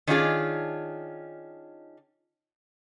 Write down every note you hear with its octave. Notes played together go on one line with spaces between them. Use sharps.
D#3 C#4 D4 F4 G#4